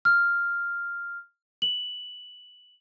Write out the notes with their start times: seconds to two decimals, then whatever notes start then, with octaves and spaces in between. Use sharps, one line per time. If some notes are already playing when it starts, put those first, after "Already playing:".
0.05 F6
1.62 F#7